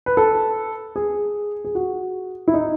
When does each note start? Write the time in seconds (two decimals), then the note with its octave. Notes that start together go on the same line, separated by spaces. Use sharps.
0.06 B4
0.17 A4
0.96 G#4
1.65 G#4
1.75 F#4
2.48 E4
2.54 D#4